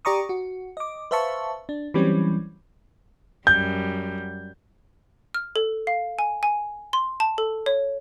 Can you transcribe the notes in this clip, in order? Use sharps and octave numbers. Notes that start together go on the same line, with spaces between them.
G4 D5 A#5 C#6 D#6
F#4
D#5 D6
B4 C5 E5 F5 A5 C#6
D4
E3 F#3 G3 C4 C#4
F#2 G3 G6
F6
A4
F5
G#5
G#5
C6
A5
A4
C#5